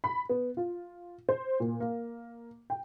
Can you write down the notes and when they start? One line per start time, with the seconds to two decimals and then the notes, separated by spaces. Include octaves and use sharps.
0.04 B5
0.29 B3
0.57 F4
1.29 C5
1.60 A#2
1.80 A#3
2.70 G5